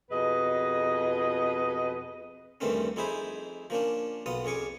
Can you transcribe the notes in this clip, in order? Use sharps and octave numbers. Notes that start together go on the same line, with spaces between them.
F2 B2 G#4 B4 D#5
E2 G2 D#3 A3 C4 C#4
F2 D#4 E4 G#4 C5 B5
F3 A#3 C#4 D4
B1 B3 F4 D#6
F2 C#4 G#4 C#6 D6